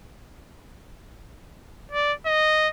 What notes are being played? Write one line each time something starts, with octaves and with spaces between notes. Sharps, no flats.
D5
D#5